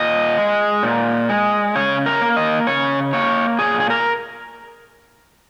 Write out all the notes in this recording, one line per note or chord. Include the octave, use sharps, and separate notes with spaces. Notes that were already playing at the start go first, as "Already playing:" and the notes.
Already playing: A#2 D#5
G#3
A#2
G#3
C#3 C#5
A#4
A#3
D#5
C#3 C#5
A#3 C#5
A#2 G#4
G#4
A#4